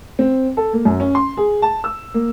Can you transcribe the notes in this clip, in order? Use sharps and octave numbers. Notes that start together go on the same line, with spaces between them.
C4
A4
A#3
F#2
C#4
C6
G#4
A5
E6
A#3